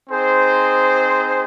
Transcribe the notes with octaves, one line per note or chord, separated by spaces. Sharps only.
C4 D#4 G#4 C5